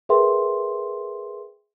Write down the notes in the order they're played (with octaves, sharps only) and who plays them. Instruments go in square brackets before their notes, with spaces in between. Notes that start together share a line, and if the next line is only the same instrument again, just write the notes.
[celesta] G#4 A#4 B4 E5 G5 C6